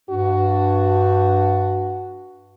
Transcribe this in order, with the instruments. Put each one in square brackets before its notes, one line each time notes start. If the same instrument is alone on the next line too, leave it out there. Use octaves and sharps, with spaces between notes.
[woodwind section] G2 D4 [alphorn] F#4